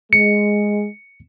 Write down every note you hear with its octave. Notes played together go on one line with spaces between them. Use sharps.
G#3 C#7